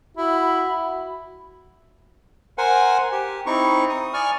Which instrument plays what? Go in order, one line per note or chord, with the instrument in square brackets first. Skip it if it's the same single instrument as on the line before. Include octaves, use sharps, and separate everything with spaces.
[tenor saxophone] E4 [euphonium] F#4 [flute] B5
[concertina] A#4 C5 F#5 G#5
G4
C4 D#4 E4 C#6
D#6
D5 G#5 C#6 F6